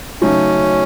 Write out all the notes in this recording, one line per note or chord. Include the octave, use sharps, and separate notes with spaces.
C#3 F#3 A3 C#4 D#4